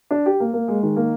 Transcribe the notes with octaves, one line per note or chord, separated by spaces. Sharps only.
D4
G4
A#3
A#3
G#3
D#3
A#3